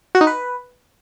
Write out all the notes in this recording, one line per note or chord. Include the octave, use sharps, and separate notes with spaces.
F#4
D#4
B4